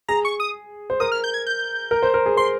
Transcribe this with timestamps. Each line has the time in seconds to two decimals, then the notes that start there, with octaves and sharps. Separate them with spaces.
0.08 G#4 A#5
0.25 C#6
0.40 D#6
0.90 C5
1.00 A#4 D#6
1.12 F6
1.24 G6
1.34 G#6
1.47 G6
1.91 A#4
2.03 C5
2.14 A#4
2.26 G#4
2.37 C5 C6